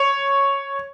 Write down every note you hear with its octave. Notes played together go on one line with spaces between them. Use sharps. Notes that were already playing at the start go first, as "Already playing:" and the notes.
Already playing: C#5